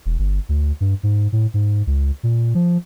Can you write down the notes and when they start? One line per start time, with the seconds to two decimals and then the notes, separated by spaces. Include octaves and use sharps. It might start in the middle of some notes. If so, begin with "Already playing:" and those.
0.06 E1
0.19 G1
0.49 D2
0.81 G2
1.03 G#2
1.32 A2
1.54 G#2
1.87 C#2
2.23 A#2
2.55 F3